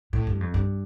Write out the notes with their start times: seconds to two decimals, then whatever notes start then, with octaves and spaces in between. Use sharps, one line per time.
0.13 A2
0.27 G2
0.41 F2
0.54 G2